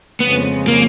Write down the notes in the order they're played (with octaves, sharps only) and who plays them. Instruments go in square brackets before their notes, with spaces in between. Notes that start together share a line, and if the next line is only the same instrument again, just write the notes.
[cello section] F2 C#3 F3 G#3 [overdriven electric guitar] B3
[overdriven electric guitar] A#3